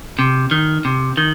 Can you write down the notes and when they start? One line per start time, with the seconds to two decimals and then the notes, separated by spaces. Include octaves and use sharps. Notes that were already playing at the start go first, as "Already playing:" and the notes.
0.19 C3
0.51 D#3
0.85 C3
1.17 D#3